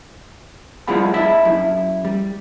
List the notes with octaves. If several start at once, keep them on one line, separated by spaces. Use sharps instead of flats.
G3 E4 F4 G#4 F#5 B5
D4 E4 D#5 E5 A5 B5
F#2 E4
G3